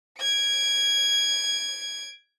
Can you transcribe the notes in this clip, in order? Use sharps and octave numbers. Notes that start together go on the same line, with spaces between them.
G#6 D7